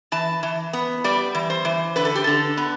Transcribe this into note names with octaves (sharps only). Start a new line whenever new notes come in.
E3 A5
E3
B3
G3 D5
E3
C5
E3
D3 B4
A4
G4
D3 A4
B3